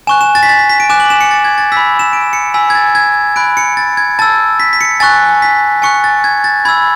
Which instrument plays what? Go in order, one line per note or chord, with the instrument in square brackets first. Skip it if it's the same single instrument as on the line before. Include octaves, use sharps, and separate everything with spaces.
[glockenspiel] G#5 C#6 F#6 E7
E7
A6
B6
A6
B6
B6
D7
G#5 D6 F#6 E7
F#7
E7
C#7
A6
G#6
A6
B5 E6 B6
E7
D7
C#7
G#5 B5 E6 B6
G#6
A6
G#6
G#5 B5 F#6 D7
C#7
A6
G#6
A5 E6 A6
B6
B6
C#7
G#5 C#6 F#6 A6
B6
G#5 C#6 F#6 C#7
A6
G#6
A6
B5 E6 G#6